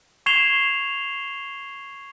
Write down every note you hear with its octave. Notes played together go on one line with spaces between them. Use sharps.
C#6 G#6 C7 E7 F7 G7